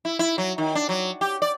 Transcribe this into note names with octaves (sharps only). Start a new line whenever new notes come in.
E4
E4
F#3
D#3
D4
F#3
G4
D5